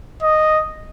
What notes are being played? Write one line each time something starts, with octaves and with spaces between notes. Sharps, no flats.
D#5